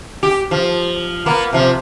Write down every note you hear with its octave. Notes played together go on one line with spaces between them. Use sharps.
G4
F3
A#3 B3
C3 F3